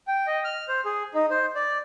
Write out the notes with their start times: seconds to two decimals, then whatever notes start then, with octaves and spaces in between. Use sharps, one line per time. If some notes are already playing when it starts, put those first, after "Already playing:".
0.07 G5
0.27 D#5
0.44 F6
0.68 C5
0.85 G#4
1.14 D#4
1.30 C5
1.55 D5